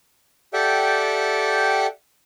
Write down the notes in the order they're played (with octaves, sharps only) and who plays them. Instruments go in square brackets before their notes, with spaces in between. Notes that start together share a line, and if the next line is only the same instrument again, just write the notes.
[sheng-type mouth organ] G4 A4 D5 E5 F#5 G5